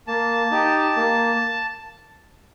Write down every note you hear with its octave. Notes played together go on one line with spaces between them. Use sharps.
A#3 A5
D#4 G4
A#3